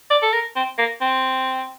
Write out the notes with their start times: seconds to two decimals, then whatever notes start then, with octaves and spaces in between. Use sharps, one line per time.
0.10 D5
0.22 A4
0.33 A#4
0.56 C4
0.78 A#3
1.01 C4